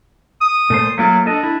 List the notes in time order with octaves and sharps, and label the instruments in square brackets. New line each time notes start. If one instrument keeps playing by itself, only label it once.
[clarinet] D#6
[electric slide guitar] A#2 A3 C5
[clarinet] F#3 [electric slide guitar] A3 A#3 F4
[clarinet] D4 [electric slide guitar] A4 D#5
[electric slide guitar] E4